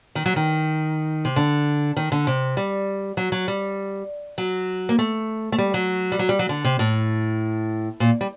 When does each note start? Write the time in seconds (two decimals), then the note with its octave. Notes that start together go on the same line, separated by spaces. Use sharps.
0.15 D#3
0.26 F#3
0.36 D#3
1.25 C3
1.36 D3
1.96 D#3
2.12 D3
2.27 C3
2.57 G3
3.17 F#3
3.32 F#3
3.48 G3
4.38 F#3
4.89 A#3
4.99 A3
5.52 A3
5.58 G3
5.74 F#3
6.12 G3
6.19 F#3
6.29 G3
6.39 F#3
6.49 D3
6.64 C3
6.79 A2
8.00 A#2
8.21 G3